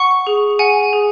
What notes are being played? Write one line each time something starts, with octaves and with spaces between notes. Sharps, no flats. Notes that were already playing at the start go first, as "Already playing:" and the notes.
Already playing: F#5 C#6
G#4
F#5 G#5
G#4